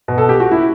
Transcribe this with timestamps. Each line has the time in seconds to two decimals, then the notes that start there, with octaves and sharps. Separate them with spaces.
0.08 B2
0.18 A4
0.29 G4
0.40 F#4
0.51 E4